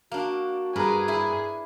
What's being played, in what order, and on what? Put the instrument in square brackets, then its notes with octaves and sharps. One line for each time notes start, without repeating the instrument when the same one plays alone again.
[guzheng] A#3 D4 [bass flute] F#4
[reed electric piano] G2 A#5 [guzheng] D4 A#4 B4 [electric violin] G#4
[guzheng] E4